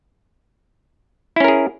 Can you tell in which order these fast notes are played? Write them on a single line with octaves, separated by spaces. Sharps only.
E4 C#4 A#4 G#4